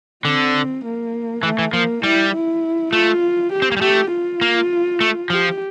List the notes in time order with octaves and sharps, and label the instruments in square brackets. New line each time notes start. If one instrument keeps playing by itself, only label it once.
[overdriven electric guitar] D3 [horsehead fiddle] C4
[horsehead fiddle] A#3
[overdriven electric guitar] E3 [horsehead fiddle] A3
[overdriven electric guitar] E3
[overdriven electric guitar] F3 [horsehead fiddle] A#3
[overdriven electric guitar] G3 [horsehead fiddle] E4
[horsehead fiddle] E4
[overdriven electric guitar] A3 [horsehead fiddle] F4
[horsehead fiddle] G4
[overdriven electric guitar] C4
A#3
G3
[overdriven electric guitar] A3 [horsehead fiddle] G4
[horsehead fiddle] F4
[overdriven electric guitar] A#3
A3
[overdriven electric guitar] F3 [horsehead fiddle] G4